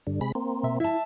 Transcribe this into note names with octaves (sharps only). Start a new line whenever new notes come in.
G2 D3
C3 G#3 B5
A#3 C4
B2 E5
E4 E5 A5